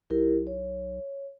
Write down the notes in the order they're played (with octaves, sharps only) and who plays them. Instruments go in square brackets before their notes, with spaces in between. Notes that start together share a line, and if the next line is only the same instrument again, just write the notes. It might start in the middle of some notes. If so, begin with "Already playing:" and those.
[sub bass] B1 [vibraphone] E4 G4 A#4
[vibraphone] C#5